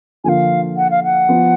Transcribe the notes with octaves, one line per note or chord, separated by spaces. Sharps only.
D3 F3 A#3 F4 F5 G#5
F#5
F5
F#5
F3 B3 F4